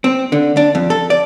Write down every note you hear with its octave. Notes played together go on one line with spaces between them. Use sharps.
C4
D3
D4
F2
A4
D5